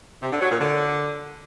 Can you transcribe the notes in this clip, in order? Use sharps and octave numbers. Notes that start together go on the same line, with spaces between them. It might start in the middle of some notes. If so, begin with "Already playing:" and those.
C3
D3
F#3
A#2
D3